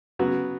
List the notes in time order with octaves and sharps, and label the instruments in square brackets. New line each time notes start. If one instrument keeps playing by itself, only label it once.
[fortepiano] C#3 F#3 B3 F#4